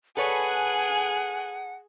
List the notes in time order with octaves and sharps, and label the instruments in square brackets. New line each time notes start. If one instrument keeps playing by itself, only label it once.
[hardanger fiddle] G#4 [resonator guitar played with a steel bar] A4 B4 C#5 [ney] F#5 [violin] G#5 F#6